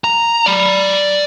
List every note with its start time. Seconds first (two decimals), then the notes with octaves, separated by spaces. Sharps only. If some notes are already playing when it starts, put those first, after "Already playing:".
0.04 A#5
0.46 D5 B5